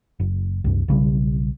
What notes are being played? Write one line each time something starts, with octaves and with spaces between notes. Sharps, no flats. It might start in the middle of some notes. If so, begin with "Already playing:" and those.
F#1
C2 F#2
B1 C#3 G3